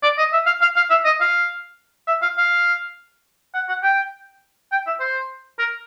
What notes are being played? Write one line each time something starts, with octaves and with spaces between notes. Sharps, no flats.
D5
D#5
E5
F5
F5
F5
E5
D#5
F5
E5
F5
F5
F#5
F#5
G5
G5
E5
C5
A#4